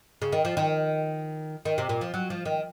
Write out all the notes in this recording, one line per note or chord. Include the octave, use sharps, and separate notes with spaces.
C#3
D#3
F3
D#3
D#3
C3
A#2
F3
F#3
F3
D#3